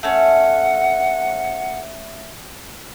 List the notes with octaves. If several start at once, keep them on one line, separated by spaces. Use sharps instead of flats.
A3 C#4 F#5